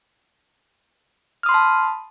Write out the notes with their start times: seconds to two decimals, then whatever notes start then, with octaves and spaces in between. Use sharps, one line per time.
1.43 F6
1.46 D#6
1.49 C6
1.51 B5
1.54 A5